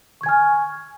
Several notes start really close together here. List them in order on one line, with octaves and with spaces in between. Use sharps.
C#6 G#6 G#5 F6